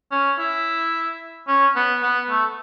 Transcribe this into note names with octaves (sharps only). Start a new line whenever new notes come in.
C#4
E4
C#4
B3
B3
A3